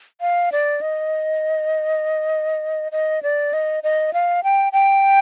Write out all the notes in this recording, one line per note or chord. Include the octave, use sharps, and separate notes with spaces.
F5
D5
D#5
D#5
D5
D#5
D#5
F5
G5
G5